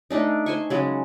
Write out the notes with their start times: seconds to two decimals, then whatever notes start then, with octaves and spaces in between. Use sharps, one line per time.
0.10 A3 D4 D#4
0.46 C5 G#5 C#6
0.70 C#3 F#3 G#3